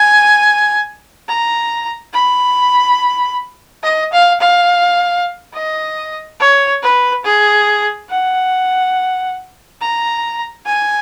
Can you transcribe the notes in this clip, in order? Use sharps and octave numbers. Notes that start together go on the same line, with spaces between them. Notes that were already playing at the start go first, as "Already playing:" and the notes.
Already playing: G#5
A#5
B5
D#5
F5
F5
D#5
C#5
B4
G#4
F#5
A#5
G#5